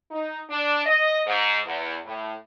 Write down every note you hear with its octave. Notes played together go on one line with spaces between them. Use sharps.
D#4
D4
D#5
G#2
E2
A2